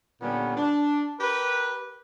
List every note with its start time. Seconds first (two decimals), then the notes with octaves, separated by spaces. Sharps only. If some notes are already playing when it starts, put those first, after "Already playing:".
0.20 A#2 D3 G3 B3 C#4
0.56 D4
1.20 G4 A#4 B4